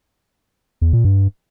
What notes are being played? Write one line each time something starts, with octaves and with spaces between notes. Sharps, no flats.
E2
A#2
G2